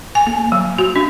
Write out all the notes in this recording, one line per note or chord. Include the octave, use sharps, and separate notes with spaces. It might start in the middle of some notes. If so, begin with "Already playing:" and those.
G#5
A#3
F#3
F#4
D4